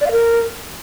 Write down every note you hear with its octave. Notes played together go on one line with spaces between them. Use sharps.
D5
F5
A#4